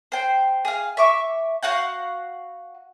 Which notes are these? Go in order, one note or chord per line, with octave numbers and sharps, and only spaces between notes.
C5 G5
G#4 F5
E5 C#6 D6
F#4 F5 F#5 G6